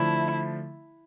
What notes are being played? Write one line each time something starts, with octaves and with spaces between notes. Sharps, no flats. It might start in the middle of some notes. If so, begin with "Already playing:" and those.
Already playing: D3 F3 A3 E4